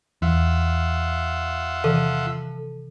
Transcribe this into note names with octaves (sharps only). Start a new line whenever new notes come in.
E2 F4 E5 F#5
C3 D#3 E3 A4